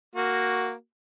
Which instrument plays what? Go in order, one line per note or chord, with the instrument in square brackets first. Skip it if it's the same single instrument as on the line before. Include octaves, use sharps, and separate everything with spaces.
[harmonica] A#3 F#4